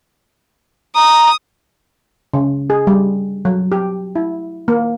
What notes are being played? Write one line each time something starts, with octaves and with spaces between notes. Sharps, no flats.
A#5 D#6
C#3
G#4
G3
F#3
G4
E4
A#3